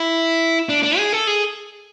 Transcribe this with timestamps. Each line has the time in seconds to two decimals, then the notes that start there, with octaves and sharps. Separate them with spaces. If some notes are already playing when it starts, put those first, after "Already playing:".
Already playing: E4
0.69 D4
0.83 D4
0.98 G#4
1.13 A4
1.27 G#4